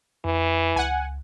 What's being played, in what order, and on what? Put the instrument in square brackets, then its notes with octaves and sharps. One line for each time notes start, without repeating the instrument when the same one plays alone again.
[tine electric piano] F2 [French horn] E3
[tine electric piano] C#2 [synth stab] F#5 G#5